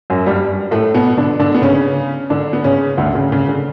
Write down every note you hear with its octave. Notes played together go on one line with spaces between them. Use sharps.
F#2 F#3
G2 G3
A2 A3
B2 B3
D3 D4
D3 D4
B3
C#3 C#4
D3 D4
B3
C#3 C#4
D2 D3
C#3
C#3
D3